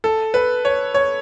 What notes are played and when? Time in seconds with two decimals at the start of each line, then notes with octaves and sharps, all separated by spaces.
0.04 A4
0.34 B4
0.65 C#5
0.94 C#5